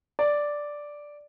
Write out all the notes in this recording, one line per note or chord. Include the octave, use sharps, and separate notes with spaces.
D5